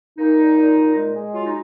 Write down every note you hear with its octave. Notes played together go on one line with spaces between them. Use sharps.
A#2 D#4
A#2
A#2
A#2
G#3
G#3
F#3 F4
D#4